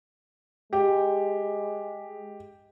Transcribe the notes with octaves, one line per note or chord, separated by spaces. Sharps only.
G#3 G4